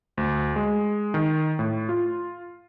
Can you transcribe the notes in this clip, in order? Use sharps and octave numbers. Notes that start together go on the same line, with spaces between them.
D2
G#3
D#3
A2
F4